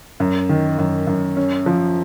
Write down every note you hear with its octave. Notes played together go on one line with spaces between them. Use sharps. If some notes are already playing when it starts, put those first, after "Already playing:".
F#2
D#3
F#2
F#2
C#4
F3